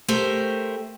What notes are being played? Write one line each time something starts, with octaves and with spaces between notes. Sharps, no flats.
A3 G4 A#4 C5